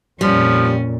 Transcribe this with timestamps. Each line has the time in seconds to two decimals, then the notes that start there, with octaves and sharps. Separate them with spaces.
0.21 F2 A#2 F3 G3 C#4